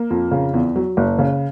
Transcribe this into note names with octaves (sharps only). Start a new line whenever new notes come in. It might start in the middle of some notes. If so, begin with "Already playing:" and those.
Already playing: A#3
F2
C#3
E2
F#3
F#1
C#3